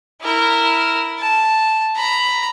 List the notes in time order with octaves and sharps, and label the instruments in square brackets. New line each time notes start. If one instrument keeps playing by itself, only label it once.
[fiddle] E4 A#4
A5
A#5 B5